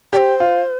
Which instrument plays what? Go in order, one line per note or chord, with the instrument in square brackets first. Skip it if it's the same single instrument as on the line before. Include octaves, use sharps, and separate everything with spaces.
[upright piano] G4 [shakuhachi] D5
[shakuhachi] C5
[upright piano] F4